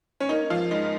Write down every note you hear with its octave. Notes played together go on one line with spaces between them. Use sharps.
C#4
A#3 D#4
F3 F4
G#2 D#4